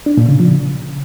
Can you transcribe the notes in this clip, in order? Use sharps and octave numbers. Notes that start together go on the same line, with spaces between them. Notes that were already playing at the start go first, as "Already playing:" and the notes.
D4
A#2
C#3
F3
C#3